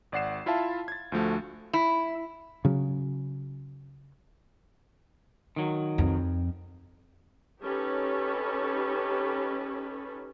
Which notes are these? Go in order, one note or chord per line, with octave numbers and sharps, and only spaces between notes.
G#1 D5 F#5 C7 E7
E4 F4 E5 F5 A5
G#6 A6
D2 F3 A3 F#4
E4
C#3 F#3
D#3 F#3
F2
C#4 D#4 G4 A4 B4 C#5